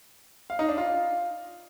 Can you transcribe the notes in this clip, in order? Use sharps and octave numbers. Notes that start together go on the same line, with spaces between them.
F5
D#4
D4
F4